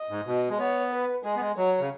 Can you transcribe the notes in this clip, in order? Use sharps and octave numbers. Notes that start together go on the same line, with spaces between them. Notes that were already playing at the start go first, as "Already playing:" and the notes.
Already playing: D#5
G#2
B2
G#3
B3 C#5
B4
G#3 G#4
B3
G#3
F#3 C#5
C#3